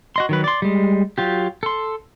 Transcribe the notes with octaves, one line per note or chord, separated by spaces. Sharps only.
F#4 D#5 C6
D#3 F#3 B4
D5 C6
G3 G#3
F#3 F4 G4
A4 C6